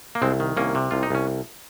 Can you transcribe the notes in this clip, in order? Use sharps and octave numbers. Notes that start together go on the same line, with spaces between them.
A#3
C2 G#3 C4
D#3
C2 A#3 C#4
C3
C2 F4
D#4
C2 C#4